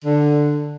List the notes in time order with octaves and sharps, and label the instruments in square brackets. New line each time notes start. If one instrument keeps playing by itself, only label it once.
[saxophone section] D3